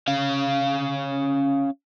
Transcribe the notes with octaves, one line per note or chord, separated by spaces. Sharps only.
C#4 F5